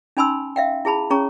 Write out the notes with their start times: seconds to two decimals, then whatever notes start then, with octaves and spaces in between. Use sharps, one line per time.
0.17 C#4 D#4 G#5 B5 C6 E6
0.56 E5 F5 G5
0.85 E4 G#4 A5 B5
1.10 C#4 G#4 C#5 A#5 C#6